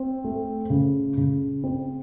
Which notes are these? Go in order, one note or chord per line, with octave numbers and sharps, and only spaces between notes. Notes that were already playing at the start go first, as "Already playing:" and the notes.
Already playing: C4
A3
C#3
C#3
C4